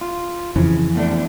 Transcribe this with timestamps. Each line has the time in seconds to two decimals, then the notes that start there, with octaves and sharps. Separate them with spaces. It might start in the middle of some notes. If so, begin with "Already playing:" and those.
0.01 F4
0.56 F2 C#3 E3
0.95 E2 A3 D4